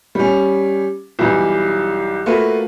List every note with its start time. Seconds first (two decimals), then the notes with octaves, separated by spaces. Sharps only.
0.15 G3 C#4
1.19 B1 E3 G3
2.26 A3 A#3 F4 F#4 B4